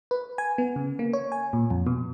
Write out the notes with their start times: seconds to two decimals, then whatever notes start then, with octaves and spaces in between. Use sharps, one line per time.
0.11 B4
0.38 G#5
0.58 B3
0.76 C#3
0.99 A#3
1.13 C#5
1.32 G#5
1.53 A#2
1.70 F2
1.87 B2